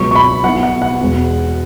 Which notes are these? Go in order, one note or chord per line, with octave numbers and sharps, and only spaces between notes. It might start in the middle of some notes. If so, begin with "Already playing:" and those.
Already playing: C#2 B2 F#3 C#6
C#6
B5
B1 B2 B3 E4 F#5
F#5
F#5
E1 E2 B2 G#3